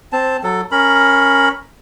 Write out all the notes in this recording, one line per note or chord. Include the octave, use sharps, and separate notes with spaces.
C4 A5
F#3 A4
C#4 A#4 B5